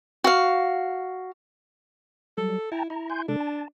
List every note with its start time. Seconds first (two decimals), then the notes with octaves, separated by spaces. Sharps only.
0.24 F#4 F5
2.38 F#3 G3 A4
2.72 E4 G5 A5 A#5
2.90 E4 A#5
3.10 G#5 C6 G6
3.28 C3 G#3 D4 A4
3.40 A5